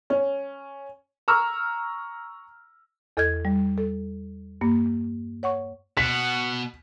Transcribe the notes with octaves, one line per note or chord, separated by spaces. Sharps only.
C#4
A#5 C#6 E6 F6
E2 A4 D#5 F6 G6 G#6
G3
A4
G2 A#3
C#5 F#5 C#6
B2 F#5 B6